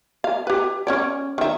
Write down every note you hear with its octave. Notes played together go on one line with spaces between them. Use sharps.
F5
G4 B4
C#4 C#5 D5
D#3 E5